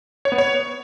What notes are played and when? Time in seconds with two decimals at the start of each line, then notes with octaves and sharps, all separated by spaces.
0.25 C#5
0.32 B3
0.38 C#5